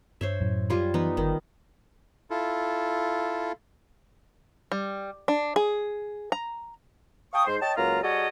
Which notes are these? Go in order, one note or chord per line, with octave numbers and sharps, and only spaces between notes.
G2 C5 C#5 E5
F#2 A2
G3 F4 G#5
E3 B3 D#4 B4
G1 D#3
E4 F4 A4
G3
D4
G#4
A#5
F5 G5 A5 C#6 D#6
G#2 C5
C#5 D#5 G5 A5
C#2 F#3 A#3 F4 A#5
G3 F#4 G#4 A4 C#5 D#5